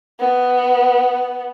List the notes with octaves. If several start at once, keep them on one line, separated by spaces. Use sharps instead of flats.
B3